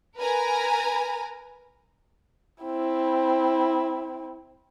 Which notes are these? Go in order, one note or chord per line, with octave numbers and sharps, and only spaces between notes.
A#4 B4 G#5 A#5
C4 E4